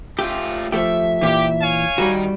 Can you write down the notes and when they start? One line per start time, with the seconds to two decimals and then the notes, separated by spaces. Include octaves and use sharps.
0.19 A3 F4 G4
0.72 F3 A3 G4 E5
1.22 A#2 E3 G4
1.62 C#5 F5 G#5
1.98 D#3 G3 F#4 A#5